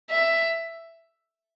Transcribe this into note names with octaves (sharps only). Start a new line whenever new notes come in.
E5